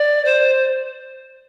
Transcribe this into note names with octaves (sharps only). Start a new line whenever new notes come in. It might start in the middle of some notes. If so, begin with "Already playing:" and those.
Already playing: D5
C5